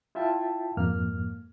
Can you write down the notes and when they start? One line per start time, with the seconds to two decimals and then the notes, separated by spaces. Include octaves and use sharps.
0.15 E4 F4 E5 G5 A5
0.77 F2 G#2 A#3 F6